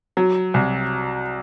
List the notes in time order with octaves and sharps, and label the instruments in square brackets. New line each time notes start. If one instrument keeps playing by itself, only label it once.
[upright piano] F#3
C2